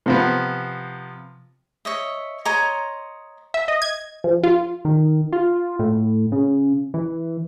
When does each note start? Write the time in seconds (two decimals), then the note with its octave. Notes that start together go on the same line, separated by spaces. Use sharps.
0.06 C3 F3 B3
1.85 C#5 D#5 E5
2.45 C#5 D#5 A#5 C6
3.54 E5
3.68 D#5
3.82 G#6
4.24 F3
4.44 F4
4.85 D#3
5.33 F4
5.79 A2
6.32 C#3
6.94 E3